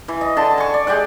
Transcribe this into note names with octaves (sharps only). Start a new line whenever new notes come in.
E3
D#5
D3 A5
G#5 C#6
D5
G#3 G4 D5 F#5